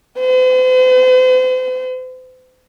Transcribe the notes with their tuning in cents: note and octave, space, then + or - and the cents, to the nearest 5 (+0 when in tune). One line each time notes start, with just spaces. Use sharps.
C5 -45